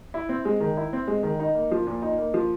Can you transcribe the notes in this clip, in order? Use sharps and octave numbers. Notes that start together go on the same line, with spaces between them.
E4
C4
G#3
D#3
E4
C4
G#3
D#3
D#4
A#3
F3
A#2
D#4
A#3
F3